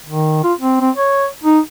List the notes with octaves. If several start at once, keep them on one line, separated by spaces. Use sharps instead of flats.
D#3
F4
C4
C4
C#5
D#4